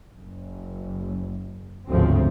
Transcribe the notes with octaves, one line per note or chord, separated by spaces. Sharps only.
F#1
G1 D2 G#2 C#3 F3 C4